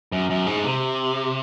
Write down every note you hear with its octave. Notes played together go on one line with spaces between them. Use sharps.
F#2
F#2
G#2
C3